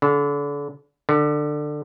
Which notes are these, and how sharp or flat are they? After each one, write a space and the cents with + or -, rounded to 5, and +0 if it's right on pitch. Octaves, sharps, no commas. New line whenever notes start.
D3 -35
D3 +20